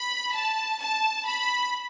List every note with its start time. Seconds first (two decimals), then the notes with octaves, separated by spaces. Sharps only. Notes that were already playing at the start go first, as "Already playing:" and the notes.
Already playing: B5
0.33 A5
0.80 A5
1.27 B5